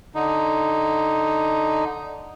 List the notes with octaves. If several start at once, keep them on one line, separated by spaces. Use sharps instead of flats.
D3 D#4